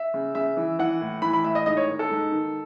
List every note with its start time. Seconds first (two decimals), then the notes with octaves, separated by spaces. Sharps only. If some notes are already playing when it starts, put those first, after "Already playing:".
Already playing: E5
0.14 C#3
0.35 C#3 E5
0.57 E3
0.79 E3 F#5
1.01 A2
1.22 E3 B5
1.33 B5
1.44 A2 E5
1.55 D#5
1.66 G#2 D#5
1.77 C#5
1.88 D#3
1.99 A4
2.10 G#2
2.32 D#3